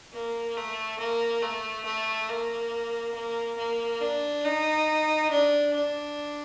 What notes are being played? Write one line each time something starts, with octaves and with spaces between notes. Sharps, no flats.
A#3
A3
A#3
A3
A3
A#3
A#3
A#3
D4
D#4
D4
D4